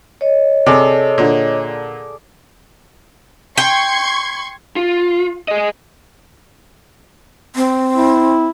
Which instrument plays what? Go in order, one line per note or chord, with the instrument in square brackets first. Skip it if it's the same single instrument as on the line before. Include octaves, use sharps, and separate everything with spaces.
[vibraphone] C#5 D#5
[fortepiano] C3 [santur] G#4 A4 D5
[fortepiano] A#2 D3
[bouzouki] G5 [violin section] C6 C#6 G#6
[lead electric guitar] F4
G#4 D#5
[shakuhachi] C4
[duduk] E4